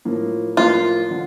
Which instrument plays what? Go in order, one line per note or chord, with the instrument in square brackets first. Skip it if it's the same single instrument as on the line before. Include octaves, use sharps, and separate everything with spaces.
[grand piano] A2 F3 A#3
[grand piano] A2 F3 A#3 [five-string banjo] F4
[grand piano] D3 F3